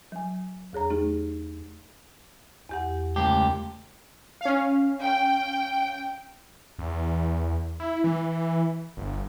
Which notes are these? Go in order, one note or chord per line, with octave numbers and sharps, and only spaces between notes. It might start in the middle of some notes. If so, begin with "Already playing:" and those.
F#3 G#5
E2 G#4 C#5 A#5
A3 D#4 G4 G#4
E2 G4 F#5
C#2 A3 G4
C#4 F5
G5
E2
E4
E3
G1